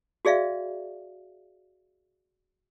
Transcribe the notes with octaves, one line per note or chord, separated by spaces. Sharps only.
F#4 G#4 D5 E5 F5